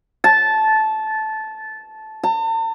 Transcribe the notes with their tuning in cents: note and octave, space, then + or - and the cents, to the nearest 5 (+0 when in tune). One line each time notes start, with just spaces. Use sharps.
A5 -15
A5 +45